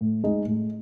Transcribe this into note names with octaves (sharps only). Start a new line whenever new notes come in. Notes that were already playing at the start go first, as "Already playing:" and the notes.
A2
G#3 D#4
A2